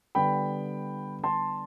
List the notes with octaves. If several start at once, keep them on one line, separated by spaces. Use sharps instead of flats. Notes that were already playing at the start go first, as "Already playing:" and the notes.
D3 G3 B3 G5 B5
A5 C6